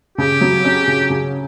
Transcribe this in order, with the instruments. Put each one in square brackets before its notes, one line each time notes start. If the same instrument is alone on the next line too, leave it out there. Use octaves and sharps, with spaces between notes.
[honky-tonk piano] C#3 [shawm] G4
[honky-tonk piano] F#3
C#4
C#3
C#3